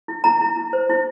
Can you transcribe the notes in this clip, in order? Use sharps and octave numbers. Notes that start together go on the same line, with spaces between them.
E4
E4 A#5
E4
E4
C5
E4